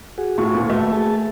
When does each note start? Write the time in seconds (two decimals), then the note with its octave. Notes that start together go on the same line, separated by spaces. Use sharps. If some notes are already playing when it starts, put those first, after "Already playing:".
0.18 F#4 G#4
0.38 A2 F4 C#6
0.54 D2 A#2 A4
0.70 A3 A#3 F#4 B4
0.92 G#4 A5